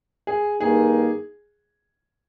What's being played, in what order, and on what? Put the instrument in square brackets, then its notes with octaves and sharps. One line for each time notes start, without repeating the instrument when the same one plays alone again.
[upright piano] G#4
[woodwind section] G2 D#3 A#3 D#4 [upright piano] G#4